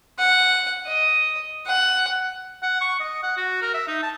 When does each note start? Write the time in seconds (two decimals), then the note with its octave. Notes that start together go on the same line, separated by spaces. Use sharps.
0.18 F#5
0.86 D#5
1.66 F#5
2.63 F#5
2.81 C#6
3.00 D#5
3.23 F#5
3.37 F#4
3.62 A#4
3.74 E5
3.88 D#4
4.03 A5